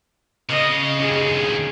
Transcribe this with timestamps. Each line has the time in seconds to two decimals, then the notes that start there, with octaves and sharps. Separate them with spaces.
0.49 C#3 D#5
1.00 D#2 C#3 G#4